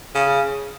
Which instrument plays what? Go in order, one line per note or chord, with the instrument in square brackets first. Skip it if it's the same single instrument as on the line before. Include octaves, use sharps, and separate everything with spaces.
[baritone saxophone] C#3